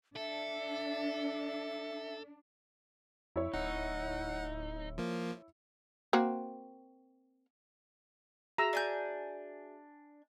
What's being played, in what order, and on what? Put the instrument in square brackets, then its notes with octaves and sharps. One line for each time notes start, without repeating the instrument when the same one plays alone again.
[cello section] D4 [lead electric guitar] A4 [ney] E5
[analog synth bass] F2 [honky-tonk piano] E4 C#5
[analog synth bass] D1 [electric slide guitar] D#4 [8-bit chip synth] F#5
[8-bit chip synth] F3 A#3
[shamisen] A#3 C4 F#4
[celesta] F#4 G#4 E5 [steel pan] A#5 E6
[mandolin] D4 G#5 G6